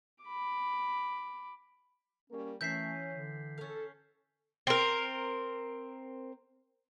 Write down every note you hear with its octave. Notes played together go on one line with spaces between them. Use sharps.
B5 D6
G3 A#3 C#4 A#4
E3 A3 C#4 A#4 E5 G6 B6 C7
D3
C#4 A4 F5
C4 A#4